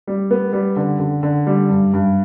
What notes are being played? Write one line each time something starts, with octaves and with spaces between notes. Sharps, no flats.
G3
B3
G3
D3
D3
D3
G3
G2
G2